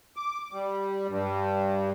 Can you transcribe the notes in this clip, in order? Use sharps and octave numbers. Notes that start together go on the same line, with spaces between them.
D6
G3
G2